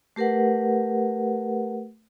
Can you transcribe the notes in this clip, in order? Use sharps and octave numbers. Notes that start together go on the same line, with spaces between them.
A3 G4 A#4 B4 F#5